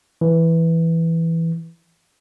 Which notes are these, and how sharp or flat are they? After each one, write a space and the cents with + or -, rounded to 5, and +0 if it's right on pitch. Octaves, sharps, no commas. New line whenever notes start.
E3 +0